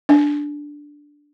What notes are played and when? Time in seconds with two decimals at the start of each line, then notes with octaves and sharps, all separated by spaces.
0.09 D4